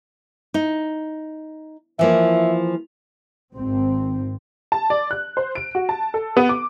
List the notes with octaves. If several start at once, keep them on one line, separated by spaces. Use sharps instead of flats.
D#4
E3 F3 A#3 E5
G#1 C4
A5
D5
F#6
C5
D7
F#4
A5
A4
B3
D6